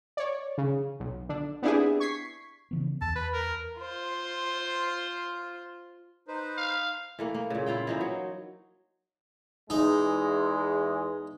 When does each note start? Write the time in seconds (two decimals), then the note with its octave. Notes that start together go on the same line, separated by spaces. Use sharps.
0.17 C#5 D5
0.58 C#3
1.00 B1
1.29 D3 D4
1.63 B3 C4 D4 E4 G4 G#4
2.00 C#6 G#6 B6 C7
2.71 C#3 E3 B3
3.01 E2 A5
3.16 B4
3.33 A#4
3.81 F4 C5
6.28 D#4 B4 C5
6.57 F5
7.19 E3 A3 A#3
7.34 A#3
7.50 A#2 C#3
7.66 E4 F4 F5 G5
7.87 E3 D#4 C5
8.01 F#3
9.70 E2 G#3 D#4